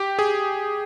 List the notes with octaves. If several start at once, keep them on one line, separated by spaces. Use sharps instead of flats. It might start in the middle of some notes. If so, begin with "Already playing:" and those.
Already playing: G4
G#4